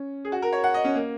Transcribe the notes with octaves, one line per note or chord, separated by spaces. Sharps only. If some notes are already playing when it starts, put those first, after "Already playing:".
Already playing: C#4
G#4
F#4
A#4
C#5
F#5
D#5
C#4
A#3